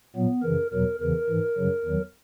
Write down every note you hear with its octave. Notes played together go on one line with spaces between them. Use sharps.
A#2 F#3 B3
F#2 C#3 E3 A#4
E2 B2 F#3 A#4
E2 C#3 E3 A#4
G#2 E3
F#2 C#3 F#3
E2 D#3 F#3